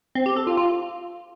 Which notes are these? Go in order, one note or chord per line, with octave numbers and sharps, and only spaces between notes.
C4
G4
A4
F4
F4